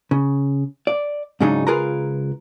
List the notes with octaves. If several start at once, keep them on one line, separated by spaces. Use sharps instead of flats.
C#3
D5
G#2 C#3 F#3 G#3 D4 D#4
C#2 F4 G#4 A#4 B4 A#5